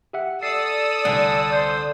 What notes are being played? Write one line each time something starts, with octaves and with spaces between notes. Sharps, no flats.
G4 E5 F#5
A4 D5 D#6 E6 C7
C2 D3 G#5 A5
C5